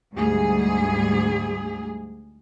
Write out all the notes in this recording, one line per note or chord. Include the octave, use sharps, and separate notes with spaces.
D2 G#2 G3 G#4